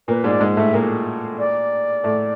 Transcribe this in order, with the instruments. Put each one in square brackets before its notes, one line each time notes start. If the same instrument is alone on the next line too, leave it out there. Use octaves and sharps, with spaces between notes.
[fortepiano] A#2 A#3 [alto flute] B4
[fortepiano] G#2 G#3 [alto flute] D5
[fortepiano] G#2 G#3
[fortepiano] A2 A3 [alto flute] E5
[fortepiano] A#2 A#3
[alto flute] D5
[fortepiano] A2 A3